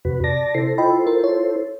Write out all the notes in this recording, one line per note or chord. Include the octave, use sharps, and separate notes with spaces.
F2 C3 F#4 B4
D5 A5 A#6
C3 E4 A4 C5 A#6 C7
F4 D#5 G5 B5
A#4
C#5